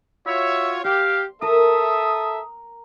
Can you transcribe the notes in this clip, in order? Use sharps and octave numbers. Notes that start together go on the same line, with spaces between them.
F4 F#4 C#5 E5
G4 F5 C6
A4 A#4 E5 D#6